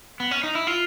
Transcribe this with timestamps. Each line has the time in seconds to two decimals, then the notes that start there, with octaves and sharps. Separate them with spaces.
0.20 B3
0.31 C#4
0.43 D#4
0.55 E4
0.67 F4